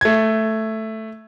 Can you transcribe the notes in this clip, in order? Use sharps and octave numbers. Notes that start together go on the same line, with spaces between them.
A3 G#6